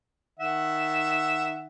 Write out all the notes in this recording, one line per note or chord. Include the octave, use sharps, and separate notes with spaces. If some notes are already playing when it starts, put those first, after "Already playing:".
D#3 E5 F#5